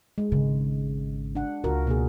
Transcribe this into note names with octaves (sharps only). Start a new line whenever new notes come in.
G#3
G#1 C#3
D4 F#5
C#2 F4 F#4 A#4
B2 A#3 G#4